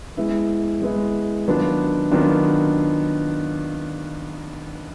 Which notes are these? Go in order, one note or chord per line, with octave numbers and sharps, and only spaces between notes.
G#3 B3 E4
G#3 B3 E4
D#3 F#3 B3 D4 F4
D#3 F#3 B3 D4 F4